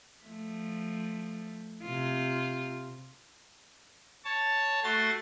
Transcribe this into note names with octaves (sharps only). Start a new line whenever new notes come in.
F3 A3
C3 F4
C#5 A5
A3 F#4 C6 A6